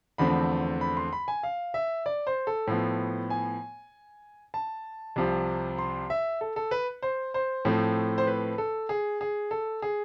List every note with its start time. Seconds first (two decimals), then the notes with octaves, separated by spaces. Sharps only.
0.18 E2 D3 F3 A3 C4 B5
0.81 B5
0.97 C6
1.13 B5
1.28 G#5
1.43 F5
1.74 E5
2.06 D5
2.27 C5
2.47 A4
2.67 A2 F3 B3
3.30 G#5
4.54 A5
5.16 C2 C3 F3
5.78 C6
6.10 E5
6.41 A4
6.56 A4
6.71 B4
7.02 C5
7.34 C5
7.65 A2 F3 A3 C4
8.18 C5
8.27 B4
8.58 A4
8.89 G#4
9.21 G#4
9.51 A4
9.82 G#4